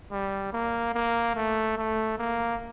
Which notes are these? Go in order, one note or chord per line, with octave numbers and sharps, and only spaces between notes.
G3
A#3
A#3
A3
A3
A#3